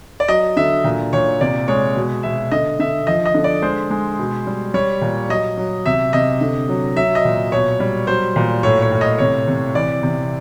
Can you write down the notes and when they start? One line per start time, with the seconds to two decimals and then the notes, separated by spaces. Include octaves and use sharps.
0.20 D5
0.28 F#3 D#5
0.57 D3 E5
0.84 A#2
1.13 A#2 C#5
1.41 C3 D5
1.68 G#3 C#5
1.96 B2
2.23 B2 E5
2.52 D3 D#5
2.79 D3 E5
3.07 F3 D#5
3.25 D#5
3.34 D3
3.44 D5
3.62 G#3 C5
3.90 G#3
4.19 B2
4.47 G3
4.74 G3 C#5
5.01 A#2
5.29 F#3 D#5
5.57 F#3
5.86 C3 E5
6.13 C3 D#5
6.41 D3
6.69 F#3
6.96 F#3 E5
7.15 D#5
7.25 A#2
7.52 B2 C#5
7.80 G3
8.07 F#3 C5
8.36 A#2
8.63 A2 C#5
8.82 C#5
8.91 A2
9.01 D#5
9.18 C3 C#5
9.47 C3
9.75 E3 D5
10.03 C3